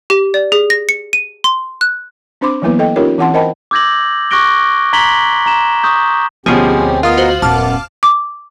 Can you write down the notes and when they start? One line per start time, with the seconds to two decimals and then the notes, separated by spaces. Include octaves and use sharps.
0.10 G4
0.34 D5
0.52 G#4
0.70 A#6
0.89 C#7
1.13 D#7
1.44 C6
1.81 F#6
2.41 C4 D4 C5 B5 C6 D6
2.62 E3 F#3 A#3 B3 E4 B4
2.79 A4 D#5 G5
2.96 C#4 D#4 F4 G4 A#4 C#5
3.18 E3 C4 E4 F#5 A5 C6
3.34 A#4 C5 D#5 G5 A5 B5
3.71 D6 E6 G6 G#6 A#6 F#7
4.31 C#6 D6 F#6 A#6 D7 G7
4.93 A#5 C6 G#6 B6 F#7 G7
5.46 A#5 E7
5.84 C#6 D#6 G6
6.46 D2 B2 F3 C4 C#4 G4 G#4
7.03 B3 F4 A#4 D#5 F5 D#6
7.17 F#4 C5 F#7
7.42 D#1 F#2 B3 A5 D6 F6
8.03 D6